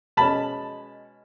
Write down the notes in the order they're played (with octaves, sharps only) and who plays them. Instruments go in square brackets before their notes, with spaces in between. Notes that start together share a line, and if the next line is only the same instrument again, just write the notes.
[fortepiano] B2 G#3 C#4 A5 B5